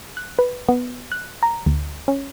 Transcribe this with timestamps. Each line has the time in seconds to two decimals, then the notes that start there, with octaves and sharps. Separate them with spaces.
0.17 F#6
0.39 B4
0.69 B3
1.12 F#6
1.43 A#5
1.66 D2
2.08 C#4